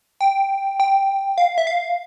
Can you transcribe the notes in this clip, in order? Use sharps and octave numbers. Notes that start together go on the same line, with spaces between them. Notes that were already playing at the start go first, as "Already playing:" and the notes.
G5
G5
F5
E5
F5